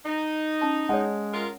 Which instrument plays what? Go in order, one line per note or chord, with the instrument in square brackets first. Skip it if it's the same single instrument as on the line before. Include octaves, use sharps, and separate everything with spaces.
[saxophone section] D#4
[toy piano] C#4 A5
[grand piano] G#3 [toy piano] C#5 F#5
[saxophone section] F4 A#4